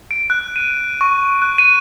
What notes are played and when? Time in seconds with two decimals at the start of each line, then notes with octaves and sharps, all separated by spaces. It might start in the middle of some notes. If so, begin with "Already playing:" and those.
0.11 D7
0.30 F#6
0.56 D#7
1.01 C#6
1.42 F#6
1.58 D#7